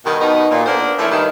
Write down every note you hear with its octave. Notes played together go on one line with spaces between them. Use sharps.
G2 B2 D#3
B2 B3 D#4
A#2
A#3 B3 D4 A4 C5
F3 A3 C#4 E4
G2 D#3